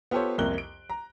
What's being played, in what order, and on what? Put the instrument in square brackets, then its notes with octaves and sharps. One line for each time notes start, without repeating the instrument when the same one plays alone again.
[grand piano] B3 F4 G4 A4 C5 C#5
C2 F2 A#3 F#6 G7
D7
A#5